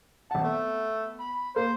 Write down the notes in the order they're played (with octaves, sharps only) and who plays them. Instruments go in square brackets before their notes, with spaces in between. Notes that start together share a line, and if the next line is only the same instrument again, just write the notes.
[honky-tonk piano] G#1 F#5 [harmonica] A5
[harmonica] A3 [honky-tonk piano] B3
[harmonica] B5
[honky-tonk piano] A#3 [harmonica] C5